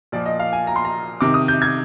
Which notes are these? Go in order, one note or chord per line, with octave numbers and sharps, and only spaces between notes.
A#2 F3 D5
D#5
F5
G#5
A#5
C6
A#5
C3 D#3 D6
D#6
G6
G#6